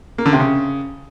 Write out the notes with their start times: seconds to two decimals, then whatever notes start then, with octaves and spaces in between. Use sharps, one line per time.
0.18 A#3
0.26 D3
0.33 C3
0.40 C#3